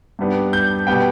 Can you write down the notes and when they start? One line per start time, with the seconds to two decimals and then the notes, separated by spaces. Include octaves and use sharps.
0.19 G2 G3 B3 D4
0.53 G6
0.87 B2 G3 B3 G5